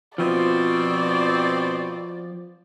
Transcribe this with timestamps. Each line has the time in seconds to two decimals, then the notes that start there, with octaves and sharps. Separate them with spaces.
0.18 B2 F3 C4 D5